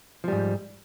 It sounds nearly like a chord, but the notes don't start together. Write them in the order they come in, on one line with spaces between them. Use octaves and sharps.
F3 G3 G#2